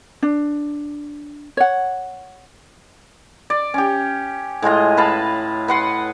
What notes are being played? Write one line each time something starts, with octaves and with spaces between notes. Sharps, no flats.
D4
C#5 F#5
D5
C#4 G4
A2 G#3 F4 D#5
B4 F5 A5 B5
B4 F#5 C6